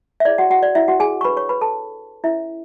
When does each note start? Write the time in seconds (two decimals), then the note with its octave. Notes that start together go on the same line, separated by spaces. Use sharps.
0.20 E5
0.25 E4 G#4 C#5 D5
0.38 F#4 F#5
0.50 F#4 F#5
0.63 D5
0.75 E4 E5
0.88 F#4 F#5
1.00 G#4 G#5
1.21 C#6
1.25 D4 A4 B4 C#5 B5
1.37 C#5 C#6
1.49 B4 B5
1.61 A4 A5
2.24 C#4 E4 A4 C#5 E5